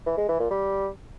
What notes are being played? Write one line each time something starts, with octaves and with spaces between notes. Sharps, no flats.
E3
G#3
E3
A#2
G3